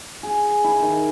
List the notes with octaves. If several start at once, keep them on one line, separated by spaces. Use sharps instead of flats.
G#4
E4
D#3